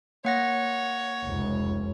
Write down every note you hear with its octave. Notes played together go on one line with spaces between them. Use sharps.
A#3 C#5 F#5 A#6
F1 C#2